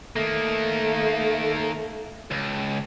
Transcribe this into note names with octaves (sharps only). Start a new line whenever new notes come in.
D#3 A3 A#3
C#2